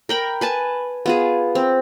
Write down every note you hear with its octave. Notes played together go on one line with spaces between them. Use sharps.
A#4 G5 B5
B4 G#5 A5
B3 F4 G#4
C4